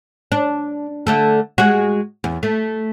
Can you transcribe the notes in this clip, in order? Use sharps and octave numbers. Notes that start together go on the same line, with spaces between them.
D4
D3 A3 A4
G#3 F#4
E2
A3